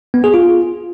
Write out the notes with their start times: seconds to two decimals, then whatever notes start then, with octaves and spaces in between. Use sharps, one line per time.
0.14 B3
0.24 G#4
0.34 F4